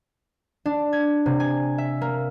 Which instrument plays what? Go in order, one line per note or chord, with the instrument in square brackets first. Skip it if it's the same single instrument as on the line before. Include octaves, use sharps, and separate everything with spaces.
[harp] D4
G#6
C3
G#5
E5
A#3